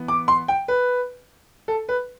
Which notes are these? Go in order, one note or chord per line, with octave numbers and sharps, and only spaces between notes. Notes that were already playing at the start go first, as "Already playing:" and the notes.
Already playing: E3 B3
D6
C6
G5
B4
A4
B4